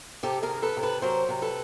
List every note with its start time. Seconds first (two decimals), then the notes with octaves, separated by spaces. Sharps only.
0.23 C3 G4 A4
0.43 G#4 A#4
0.49 D#3
0.62 A4 B4
0.77 C3
0.83 A4 B4
1.02 F#3 A#4 C5
1.29 C3
1.42 A4 B4